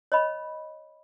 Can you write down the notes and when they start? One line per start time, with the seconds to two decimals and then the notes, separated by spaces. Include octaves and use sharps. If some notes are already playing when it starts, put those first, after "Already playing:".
0.12 C#5 D#5 B5